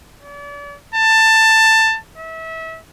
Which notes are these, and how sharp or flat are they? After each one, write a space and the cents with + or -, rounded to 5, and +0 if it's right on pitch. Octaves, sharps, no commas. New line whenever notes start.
D5 -40
A5 +15
E5 -30